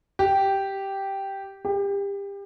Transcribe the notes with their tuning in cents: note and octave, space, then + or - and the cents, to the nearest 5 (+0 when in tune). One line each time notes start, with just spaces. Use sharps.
G4 -5
G4 +30